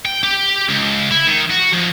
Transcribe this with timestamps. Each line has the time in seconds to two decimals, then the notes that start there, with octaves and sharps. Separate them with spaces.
0.05 G5
0.23 G4
0.69 C#2
1.11 E4
1.27 D#3
1.51 F#4
1.73 F2